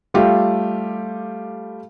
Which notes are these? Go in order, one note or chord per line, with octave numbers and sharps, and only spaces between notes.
G3 A3 F4 G4